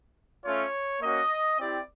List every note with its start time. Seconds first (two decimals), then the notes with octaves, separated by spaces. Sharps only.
0.45 A3 C#4 F4 C#5
1.01 A#3 C#4 F#4 D#5
1.58 C4 E4 G4 D5